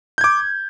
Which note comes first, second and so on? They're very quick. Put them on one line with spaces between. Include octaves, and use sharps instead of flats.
G6 G#6 D6